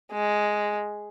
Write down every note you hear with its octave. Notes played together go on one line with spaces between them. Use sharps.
G#3